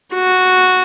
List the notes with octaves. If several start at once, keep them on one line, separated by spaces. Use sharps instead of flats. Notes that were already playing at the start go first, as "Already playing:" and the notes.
F#4